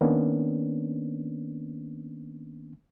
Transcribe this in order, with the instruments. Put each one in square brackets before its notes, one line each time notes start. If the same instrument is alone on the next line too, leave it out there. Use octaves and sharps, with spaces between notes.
[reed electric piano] D#3 A#3 B3 C#4 D4